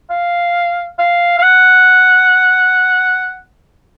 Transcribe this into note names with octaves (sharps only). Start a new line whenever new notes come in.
F5
F5
F5
F#5